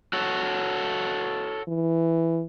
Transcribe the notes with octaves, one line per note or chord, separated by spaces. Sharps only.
F#4 A4 C#5
E3